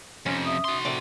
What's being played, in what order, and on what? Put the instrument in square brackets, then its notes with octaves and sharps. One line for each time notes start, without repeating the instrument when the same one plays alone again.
[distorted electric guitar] F2 C3 [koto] C#4
[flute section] E5 D#6
[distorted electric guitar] F#4 C6
[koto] A2 C3 D5